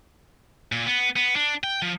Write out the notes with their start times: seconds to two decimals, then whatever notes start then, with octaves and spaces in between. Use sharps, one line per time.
0.72 A#2
0.86 B3
1.16 B3
1.36 D4
1.64 G5
1.82 F3